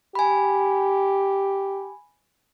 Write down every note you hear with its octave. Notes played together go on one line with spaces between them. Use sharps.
G4 G#5 B5